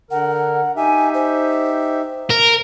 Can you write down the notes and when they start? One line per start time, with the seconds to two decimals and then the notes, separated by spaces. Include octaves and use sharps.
0.11 D3 A#4 F#5
0.77 D#4 G4 E5 G#5
1.14 C5
2.30 A#4